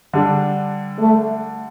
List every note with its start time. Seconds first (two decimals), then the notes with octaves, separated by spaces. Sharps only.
0.13 D3 G3 D4
0.99 A3